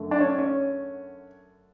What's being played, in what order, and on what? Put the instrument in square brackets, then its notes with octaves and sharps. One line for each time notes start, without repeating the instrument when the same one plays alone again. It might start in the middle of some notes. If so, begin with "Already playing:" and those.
Already playing: [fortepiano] F#2 D3 A3
D4
C#4
C#4